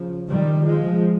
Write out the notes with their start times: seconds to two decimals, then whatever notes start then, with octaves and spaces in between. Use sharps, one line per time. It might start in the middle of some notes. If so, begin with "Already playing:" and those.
Already playing: C#3 F3
0.29 D#3 G3
0.65 F3 G#3